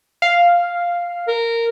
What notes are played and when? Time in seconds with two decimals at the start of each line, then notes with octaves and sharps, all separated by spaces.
0.22 F5
1.28 A#4